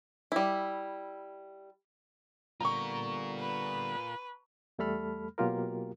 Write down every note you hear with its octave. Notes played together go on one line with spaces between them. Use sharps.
G3 E4
D3 G3 B3 F4 A#4 A#5 C#6
B4
E2 G3 A3 A4 B5 F6
B2 F#3 A#3 F4 G4 A#4